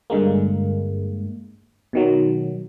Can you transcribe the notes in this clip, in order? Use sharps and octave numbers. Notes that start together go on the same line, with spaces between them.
G2 D3 G#3 A#3
B2 D#3 F#3